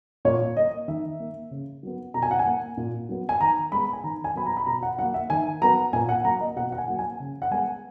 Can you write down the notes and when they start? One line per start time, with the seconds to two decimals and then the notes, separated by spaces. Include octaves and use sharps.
0.25 A#2 C#5
0.57 A#3 D#5
0.88 D#3 E5
1.20 A#3
1.51 C#3
1.83 F#3 B3
2.14 B2 A#5
2.22 G#5
2.31 F#5
2.39 G#5
2.46 A#3
2.77 A#2
3.09 F#3 B3
3.29 G#5
3.41 D#3 A#5
3.72 G#3 B3 B5
3.93 G#5
4.04 D#3 A#5
4.24 G#5
4.35 F#3 B3 B5
4.46 A#5
4.57 B5
4.67 B2 A#5
4.83 F#5
4.98 F#3 F#5
5.03 A#3
5.14 E5
5.30 D#3 G#5
5.62 F#3 B3 A#5
5.93 A#2 G#5
6.09 F#5
6.25 F#3 A#3 A#5
6.41 D#5
6.56 B2 F#5
6.72 F#5
6.78 G#5
6.88 F#3 A#3
6.99 G#5
7.20 C#3
7.42 F#5
7.51 G#3 B3 G#5